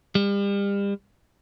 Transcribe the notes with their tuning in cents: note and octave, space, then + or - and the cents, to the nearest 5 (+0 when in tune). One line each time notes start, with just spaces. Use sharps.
G3 +35